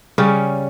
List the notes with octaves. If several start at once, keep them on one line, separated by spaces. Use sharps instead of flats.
C#3 G3 C#4